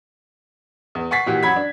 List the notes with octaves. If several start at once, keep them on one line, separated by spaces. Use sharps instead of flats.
E2
F#5 G#5 C#6 A6 B6 C7
A#2 E3 F#4 G4
F#2 F#3 F#5 B5 G#6 B6
D4